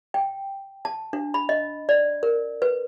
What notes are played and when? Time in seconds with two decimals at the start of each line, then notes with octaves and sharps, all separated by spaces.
0.14 G5
0.85 A5
1.13 D4
1.34 B5
1.49 D#5
1.89 D5
2.23 A#4
2.62 B4